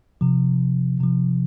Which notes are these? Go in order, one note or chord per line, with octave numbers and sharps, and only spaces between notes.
C3 F3
C3 F3